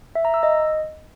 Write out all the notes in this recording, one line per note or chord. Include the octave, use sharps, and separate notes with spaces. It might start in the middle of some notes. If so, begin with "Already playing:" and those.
E5
A#5
E6
D#5